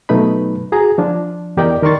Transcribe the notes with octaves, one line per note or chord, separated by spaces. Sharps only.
B2 F#3 A3 D#4 B4 B5
F#4 G#4 A#5
F3 D4 F4
E2 G4 A#4 D5 D#5 G5
D#3 A#4 D5 C6 C#6 A6